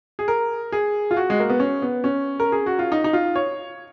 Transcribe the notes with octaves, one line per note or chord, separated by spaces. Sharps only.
G#4
A#4
G#4
F4
F#4
G#3
A#3
B3
C#4
B3
C#4
A#4
G#4
F#4
F4
D#4
D#4
F4
C#5